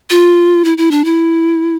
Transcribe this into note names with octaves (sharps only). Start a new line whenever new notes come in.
F4
E4
E4
D4
E4